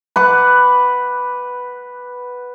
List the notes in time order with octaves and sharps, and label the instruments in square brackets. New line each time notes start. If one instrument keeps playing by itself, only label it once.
[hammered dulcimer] B4 F#5 D6